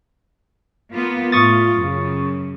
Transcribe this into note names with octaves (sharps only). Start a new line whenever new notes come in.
A#3 B3 F4
A2 F4 C#6 D#6 A6
F#2 C#3